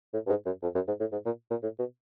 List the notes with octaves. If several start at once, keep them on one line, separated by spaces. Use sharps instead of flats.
A2
G2
G#2
F#2
F2
F#2
G#2
A2
G#2
A#2
A#2
A2
B2